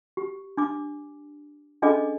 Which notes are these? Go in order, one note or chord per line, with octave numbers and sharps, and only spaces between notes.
G4
D4 D6
C#4 D4 G#4 A4 D#5 D6